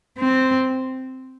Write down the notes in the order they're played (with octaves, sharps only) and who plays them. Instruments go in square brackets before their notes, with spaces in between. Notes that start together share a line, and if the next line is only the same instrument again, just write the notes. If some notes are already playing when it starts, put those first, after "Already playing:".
[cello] C4